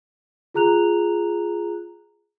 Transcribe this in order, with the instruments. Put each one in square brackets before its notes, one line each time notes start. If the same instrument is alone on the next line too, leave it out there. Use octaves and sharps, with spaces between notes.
[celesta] F4 G#4 A#5 F#6 F7